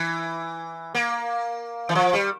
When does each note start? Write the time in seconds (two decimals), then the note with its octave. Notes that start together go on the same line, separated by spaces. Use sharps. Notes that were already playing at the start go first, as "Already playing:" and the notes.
Already playing: E3
0.95 A#3
1.89 E3
1.95 F3
2.13 G3